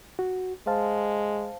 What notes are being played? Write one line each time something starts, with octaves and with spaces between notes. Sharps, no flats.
F#4
G#3 C5 F5 A5